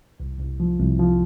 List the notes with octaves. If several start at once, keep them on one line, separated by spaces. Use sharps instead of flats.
C2
C2
F3
C2
F3